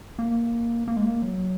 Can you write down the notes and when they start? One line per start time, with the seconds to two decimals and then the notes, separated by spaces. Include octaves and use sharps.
0.19 A#3
0.88 A#3
0.97 G#3
1.05 A#3
1.22 F#3